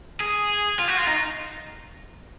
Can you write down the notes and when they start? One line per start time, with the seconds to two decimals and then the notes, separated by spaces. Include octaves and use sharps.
0.20 G#4
0.79 F4
0.88 F#4
0.97 F4
1.07 D#4